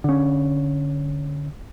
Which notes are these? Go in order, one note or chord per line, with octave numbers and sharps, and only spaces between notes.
D3 C#4